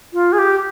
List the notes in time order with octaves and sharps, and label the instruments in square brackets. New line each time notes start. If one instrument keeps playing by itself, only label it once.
[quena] F4
G#4
G4